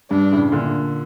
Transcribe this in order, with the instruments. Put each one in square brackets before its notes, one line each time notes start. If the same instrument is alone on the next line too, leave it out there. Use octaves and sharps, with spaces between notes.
[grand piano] G2 [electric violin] D4
[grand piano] A2 C#3
A#2 D3